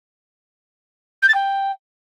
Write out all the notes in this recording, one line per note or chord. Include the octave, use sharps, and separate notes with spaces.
G6
A6
G5